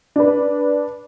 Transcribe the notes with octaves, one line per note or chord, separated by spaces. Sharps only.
D4 B4